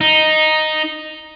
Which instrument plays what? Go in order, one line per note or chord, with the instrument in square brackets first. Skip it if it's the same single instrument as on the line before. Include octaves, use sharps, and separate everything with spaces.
[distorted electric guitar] D#4